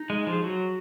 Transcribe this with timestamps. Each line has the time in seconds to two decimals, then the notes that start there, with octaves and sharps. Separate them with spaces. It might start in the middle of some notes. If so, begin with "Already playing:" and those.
Already playing: D#4
0.10 G#3
0.27 F3 G#4
0.43 F#3 F#4